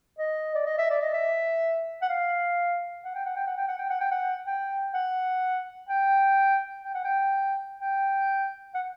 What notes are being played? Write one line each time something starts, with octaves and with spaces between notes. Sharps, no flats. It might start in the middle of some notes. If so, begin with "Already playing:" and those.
D#5
D5
D#5
E5
D5
D#5
E5
F#5
F5
F#5
G5
F#5
G5
F#5
G5
F#5
G5
F#5
G5
F#5
G5
F#5
G5
G5
F#5
G5
G5
F#5